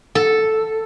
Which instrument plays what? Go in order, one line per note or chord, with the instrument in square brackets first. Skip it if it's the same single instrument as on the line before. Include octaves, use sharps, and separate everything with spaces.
[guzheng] A4